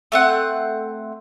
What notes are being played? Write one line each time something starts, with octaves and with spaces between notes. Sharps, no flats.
A3 C4 F#5